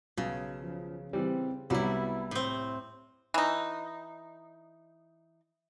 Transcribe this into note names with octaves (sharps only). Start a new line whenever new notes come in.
B1 C#3
F3
E3 G3 C4
C2 F#3 G3 B3 E4
A2 C4
E3 D#4